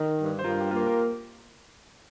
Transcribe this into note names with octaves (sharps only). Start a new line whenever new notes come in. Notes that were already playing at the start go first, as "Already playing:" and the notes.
Already playing: D#3
G2
C5
G2 F4 A#4
G4
A#3 F4 A#4
A#4